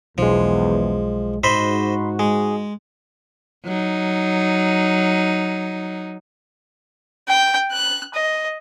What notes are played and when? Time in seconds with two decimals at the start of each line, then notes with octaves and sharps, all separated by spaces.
0.18 B1 E2 F3 G#3
1.44 G#2 D#4 F#4 C5 D#5 E5 B5 C6
2.19 G#3 G#4
3.64 F#3 D#4
7.28 G5
7.72 F#6
8.14 D#5